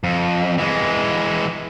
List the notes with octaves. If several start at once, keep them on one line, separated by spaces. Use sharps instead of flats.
F2
E3 G#3